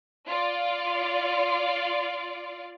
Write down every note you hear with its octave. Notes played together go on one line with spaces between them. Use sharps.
F4 D5